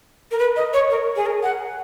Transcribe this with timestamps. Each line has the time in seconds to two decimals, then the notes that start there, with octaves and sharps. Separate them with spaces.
0.31 A#4
0.39 B4
0.56 D#5
0.73 C#5
0.90 A#4
1.16 G#4
1.26 A#4
1.43 F#5